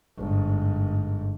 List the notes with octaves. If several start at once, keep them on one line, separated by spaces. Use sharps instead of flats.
G1 G#2